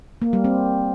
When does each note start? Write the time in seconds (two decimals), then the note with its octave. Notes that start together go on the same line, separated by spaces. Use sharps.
0.22 A#3
0.33 G3
0.44 C4